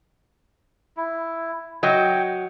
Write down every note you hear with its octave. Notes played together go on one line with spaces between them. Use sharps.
E4
F#3 D#5 G5